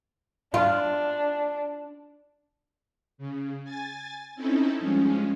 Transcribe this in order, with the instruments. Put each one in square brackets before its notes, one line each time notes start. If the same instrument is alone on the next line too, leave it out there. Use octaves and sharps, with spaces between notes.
[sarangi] D4 [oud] F4
[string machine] C#3
G#5 A6
C4 C#4 D#4 E4 A4
G2 F3 G#3 C#4